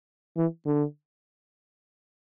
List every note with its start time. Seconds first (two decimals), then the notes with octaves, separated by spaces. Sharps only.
0.37 E3
0.66 D3